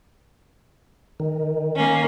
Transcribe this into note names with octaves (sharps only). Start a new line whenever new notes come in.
D#3
A#3 C#4